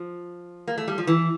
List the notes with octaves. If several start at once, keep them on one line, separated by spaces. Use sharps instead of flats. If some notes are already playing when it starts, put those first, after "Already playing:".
Already playing: F3
A#3
A3
G3
F3
E3